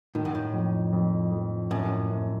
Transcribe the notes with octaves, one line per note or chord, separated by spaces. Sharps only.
A2 D#3
F#2
A2
F2
F2
F2
F#2 A2
F#2